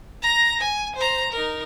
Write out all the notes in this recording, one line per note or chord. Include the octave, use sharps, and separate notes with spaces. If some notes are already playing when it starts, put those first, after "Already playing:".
A#5 A#6
G#5
C5 A#5
D#4 A#4